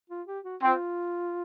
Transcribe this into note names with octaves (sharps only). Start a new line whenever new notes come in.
F4
G4
F#4
C4 F4